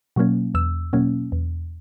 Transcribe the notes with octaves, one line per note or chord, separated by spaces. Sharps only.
B2 F#3 A#3 C#4
E2 E6
B2 F#3 A#3 C#4
E2